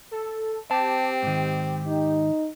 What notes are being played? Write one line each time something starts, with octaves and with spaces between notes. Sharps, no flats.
A4
C4 G4 A5
G#2 D#3
D#4